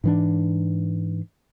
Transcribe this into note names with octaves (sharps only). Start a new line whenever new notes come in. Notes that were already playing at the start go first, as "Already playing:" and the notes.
G#2 E3 D4